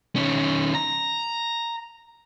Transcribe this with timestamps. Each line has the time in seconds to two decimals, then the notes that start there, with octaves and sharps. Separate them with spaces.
0.16 D#3 C#4
0.75 A#5